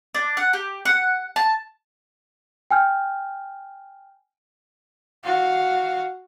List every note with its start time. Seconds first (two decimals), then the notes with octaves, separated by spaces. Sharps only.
0.15 D4
0.37 F#5
0.53 G4
0.85 F#5
1.36 A5
2.71 G5 G#5 F6 G6
5.24 F#4 F5